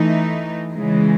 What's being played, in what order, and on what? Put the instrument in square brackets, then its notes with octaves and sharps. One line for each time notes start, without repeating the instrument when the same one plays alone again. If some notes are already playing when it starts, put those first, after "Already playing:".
Already playing: [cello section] E3 A3 D#4
C#3 E3 G#3